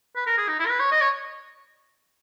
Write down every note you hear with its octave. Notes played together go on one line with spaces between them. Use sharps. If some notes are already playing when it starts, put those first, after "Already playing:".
B4
A#4
G#4
D#4
E4
A#4
B4
C#5
D#5
C#5